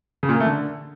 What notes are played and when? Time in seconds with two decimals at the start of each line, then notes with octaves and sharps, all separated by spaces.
0.23 C#3
0.29 A#2
0.35 A#3
0.40 A3
0.46 D3